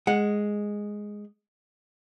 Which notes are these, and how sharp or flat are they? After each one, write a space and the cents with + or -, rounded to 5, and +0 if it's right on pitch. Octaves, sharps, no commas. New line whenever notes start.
G#3 +0 F#5 +0